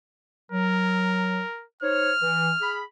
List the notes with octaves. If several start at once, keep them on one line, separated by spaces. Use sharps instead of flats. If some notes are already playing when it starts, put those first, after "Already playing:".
F#3 A#4
D#4 C5 C#5 F6
E3
G#4 B5